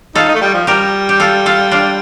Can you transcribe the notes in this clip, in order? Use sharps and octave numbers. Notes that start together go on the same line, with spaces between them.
D#4 F4 A4
D#4
A3
G3
F3
G3 G4 A#4
G4
F4 A4
F4 A4
D4 F4